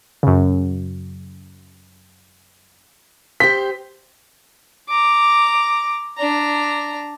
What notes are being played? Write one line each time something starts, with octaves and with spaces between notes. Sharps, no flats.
F#2 C#3
G4 C5 B6
A#5 D6
D4 A#5